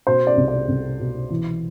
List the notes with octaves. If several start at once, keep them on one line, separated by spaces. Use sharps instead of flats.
B2 C5
D5
C2
D5
C2
B2
E3